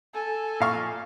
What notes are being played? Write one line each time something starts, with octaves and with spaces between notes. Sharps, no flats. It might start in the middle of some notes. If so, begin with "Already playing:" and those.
A4 G#5
A#2 F5 C#6